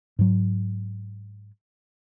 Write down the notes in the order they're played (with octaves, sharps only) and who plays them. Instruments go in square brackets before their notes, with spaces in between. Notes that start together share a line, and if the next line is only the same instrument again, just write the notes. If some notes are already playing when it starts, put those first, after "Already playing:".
[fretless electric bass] G#2 F#3